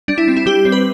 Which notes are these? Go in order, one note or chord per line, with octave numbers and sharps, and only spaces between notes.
G3 D4
E4
C4
E4
G3 G4
C4
B4